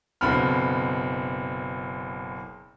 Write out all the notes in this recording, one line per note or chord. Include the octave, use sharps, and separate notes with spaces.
F#1 B2 D3 C4 B5 F6